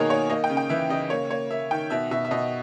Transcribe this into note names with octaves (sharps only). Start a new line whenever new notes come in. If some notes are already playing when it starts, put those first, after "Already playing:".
Already playing: B2 D#3 A#3 G#4 A#4 C#5 D#5
A#3 C#5
A#3 D#5
G5
C#3
G5
E3 E5
C#3 D#5
A#3 C#5
A#3 C#5
A#3 E5
D#3 G5
B2 E5
B2 E5
E5
B2 D#5